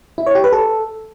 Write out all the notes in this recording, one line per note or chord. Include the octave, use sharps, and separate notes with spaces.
E4
C#5
G4
B4
A4